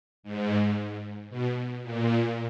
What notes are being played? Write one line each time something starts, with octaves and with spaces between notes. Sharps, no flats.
G#2
B2
A#2